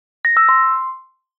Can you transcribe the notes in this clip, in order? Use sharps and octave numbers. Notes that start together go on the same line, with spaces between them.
A#6
E6
C6